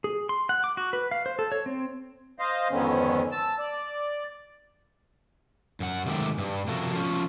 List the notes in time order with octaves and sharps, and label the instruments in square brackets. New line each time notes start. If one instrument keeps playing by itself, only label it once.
[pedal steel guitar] G#4
C6
F#5
D6
F#4
B4
F5
C5
A4
C#5
C4
[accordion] C5 D#5 F5
F2 G#2 D3 D#3 B3 C#4
A5 E6
D5
[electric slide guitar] F#2 F#5
C3 D#3 G#3 A3 F4 G4
G2
C3 F3 F#4 A4 A#4
F3 C#4